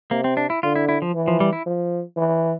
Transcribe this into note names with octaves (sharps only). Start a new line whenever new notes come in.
C3 A#3
C4
D4
E4
D3 F4
E4
E4
F3
E3
F3
G3
E4
F3
E3